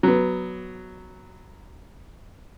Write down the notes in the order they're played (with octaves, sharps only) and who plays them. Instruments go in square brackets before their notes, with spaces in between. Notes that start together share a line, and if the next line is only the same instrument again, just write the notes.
[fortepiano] F#3 B3